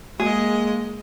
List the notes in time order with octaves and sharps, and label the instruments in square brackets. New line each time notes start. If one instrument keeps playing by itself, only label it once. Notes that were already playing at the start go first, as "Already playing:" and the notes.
[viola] G#3 D#5 [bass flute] A#3 [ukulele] G#4